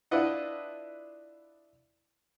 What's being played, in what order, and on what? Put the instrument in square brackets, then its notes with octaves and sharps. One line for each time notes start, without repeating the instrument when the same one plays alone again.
[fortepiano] D4 E4 F4 B4 D#5 F#5